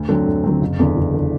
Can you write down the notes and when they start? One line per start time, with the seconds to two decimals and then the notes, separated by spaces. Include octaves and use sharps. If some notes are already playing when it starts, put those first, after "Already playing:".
Already playing: D2
0.09 D3 F#3 C4
0.26 D2
0.44 D3 F#3 C4
0.61 F#1
0.79 E2 D3
0.96 F#1
1.14 D3